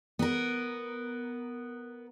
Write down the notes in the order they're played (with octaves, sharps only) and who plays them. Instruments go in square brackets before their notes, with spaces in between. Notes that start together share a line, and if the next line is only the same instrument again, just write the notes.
[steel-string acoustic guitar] B3 A#4